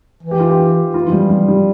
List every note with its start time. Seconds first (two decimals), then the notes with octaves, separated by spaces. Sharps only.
0.23 E3
0.31 G4
0.39 F4
0.49 G4
0.94 E3 F4
1.07 F3
1.12 G3
1.30 G3
1.48 G3